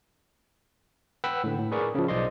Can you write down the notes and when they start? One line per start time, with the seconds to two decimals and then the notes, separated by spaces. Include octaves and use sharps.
1.24 B4 F#5 G5 B5 E6
1.44 A2 D3
1.58 A2
1.71 G#4 A#4 B4 D5 C#6
1.95 C#3 F3
2.08 B1 C5 D5 D#5 C6